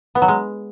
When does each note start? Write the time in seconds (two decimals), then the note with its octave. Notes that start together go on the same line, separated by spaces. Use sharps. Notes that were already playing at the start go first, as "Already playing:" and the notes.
0.15 B3
0.22 F#3
0.28 G#3